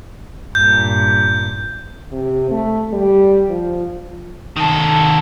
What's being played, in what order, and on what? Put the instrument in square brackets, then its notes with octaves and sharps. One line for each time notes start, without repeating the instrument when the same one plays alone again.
[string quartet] G2 A#2 [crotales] G6
[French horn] C3
A3
G3
F3
[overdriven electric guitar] D#3 A4